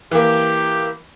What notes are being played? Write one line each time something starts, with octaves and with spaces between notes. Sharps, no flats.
E3 A#3 G4